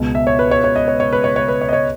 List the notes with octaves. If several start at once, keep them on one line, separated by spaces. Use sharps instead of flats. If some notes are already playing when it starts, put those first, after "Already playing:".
Already playing: C#2 B2
E5
C#5
B4
C#5
C#5
D#5
C#5
C#5
B4
C#5
C#5
B4
C#5
D#5
C#5